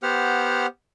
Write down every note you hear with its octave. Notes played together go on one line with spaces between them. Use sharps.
B3 G4 C5 F#5 F6